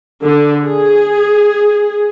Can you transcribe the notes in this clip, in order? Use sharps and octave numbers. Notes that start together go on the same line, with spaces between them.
D3
G#4